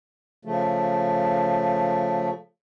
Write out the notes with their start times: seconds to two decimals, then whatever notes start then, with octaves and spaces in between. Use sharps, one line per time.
0.45 C#3 F3 A3